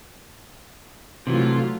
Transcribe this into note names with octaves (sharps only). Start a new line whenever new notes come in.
C3 E3 F#3 A3 F4